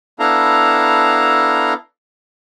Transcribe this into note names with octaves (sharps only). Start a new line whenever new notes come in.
B3 D4 E4 A4 F5 A#5